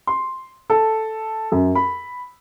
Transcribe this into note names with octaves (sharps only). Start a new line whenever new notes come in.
C6
A4
F#2
B5